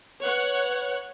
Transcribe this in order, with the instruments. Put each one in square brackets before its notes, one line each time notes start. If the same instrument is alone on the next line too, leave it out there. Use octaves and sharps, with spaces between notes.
[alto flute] B4 [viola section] C#5 F#5